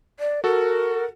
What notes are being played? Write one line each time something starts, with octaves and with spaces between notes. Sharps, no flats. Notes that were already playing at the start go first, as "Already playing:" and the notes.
D5
F#4 A4 A#4